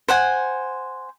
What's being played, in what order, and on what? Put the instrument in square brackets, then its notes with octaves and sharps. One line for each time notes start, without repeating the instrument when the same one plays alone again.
[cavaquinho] C5 F#5 G#5